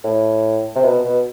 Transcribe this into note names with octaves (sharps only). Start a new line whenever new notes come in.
A2
C3
B2
B2